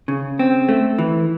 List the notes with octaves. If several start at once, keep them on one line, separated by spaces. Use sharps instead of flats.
C#3
C4
A3
E3